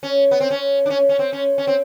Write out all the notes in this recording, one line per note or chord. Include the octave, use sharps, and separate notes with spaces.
C#4
B3
C4
C#4
D4
C#4
C#4
C4
C#4
C#4
C4